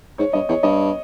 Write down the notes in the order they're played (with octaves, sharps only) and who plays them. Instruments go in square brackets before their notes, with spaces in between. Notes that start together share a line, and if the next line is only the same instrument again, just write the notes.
[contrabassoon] G#2 [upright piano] C#5
[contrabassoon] G2 [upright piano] D#5
[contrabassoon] E2 [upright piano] C#5
[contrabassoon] G2 [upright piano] D#5